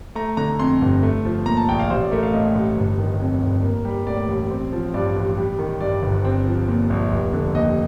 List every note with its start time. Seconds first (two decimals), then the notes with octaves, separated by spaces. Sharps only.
0.15 A3 A#5
0.37 D3 A#5
0.59 F2 C6
0.82 G1
1.03 A3
1.25 F3
1.46 A#2 A#5
1.57 A5
1.68 A#1 G5
1.79 F5
1.90 A1 C5
2.01 D5
2.11 A3 A#4
2.23 F5
2.33 A2 D#5
2.55 A1
2.76 G1
2.99 D#3
3.20 F2
3.43 G1
3.63 A#3
3.85 G3
4.07 A2 D5
4.28 A1
4.50 C4
4.73 F3
4.94 G2 D5
5.16 A1
5.37 G3
5.59 D#3
5.81 G2 D5
6.02 G1
6.24 C4
6.47 F3
6.69 A#2
6.90 A#1
7.12 F1
7.33 D3
7.55 D#2 D#5